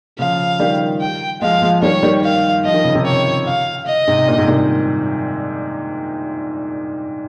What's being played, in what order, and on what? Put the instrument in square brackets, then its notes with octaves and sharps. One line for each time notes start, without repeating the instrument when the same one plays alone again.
[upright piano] C#3 F3 [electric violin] F5
[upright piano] D#3 G3
[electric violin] G5
[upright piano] F3 G#3 [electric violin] F5
[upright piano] F3 G#3
[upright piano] D#3 G3 [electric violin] C#5
[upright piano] D#3 G3
[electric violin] F5
[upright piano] F3 [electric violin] D#5
[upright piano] D#3
C#3
C3 D#3
[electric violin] C#5
F5
D#5
[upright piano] G#2 C3
G2 A#2
G#2 C3
D#3 G3